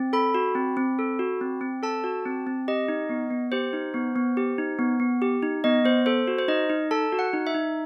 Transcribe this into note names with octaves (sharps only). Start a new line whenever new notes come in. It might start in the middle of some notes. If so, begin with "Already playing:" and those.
Already playing: C4
A4 B5
F#4
C4
C4
A4
F#4
C4
C4
A4 A5
F#4
C4
C4
G4 D#5
D#4
B3
B3
G4 C5
D#4
B3
B3
G4
D#4
B3
B3
G4
D#4
B3 D#5
B3 C5
A4 C5
F#4
C5
D#4 D#5
D#4
A4 A5
F#4
F#5
D#4
E5
D#4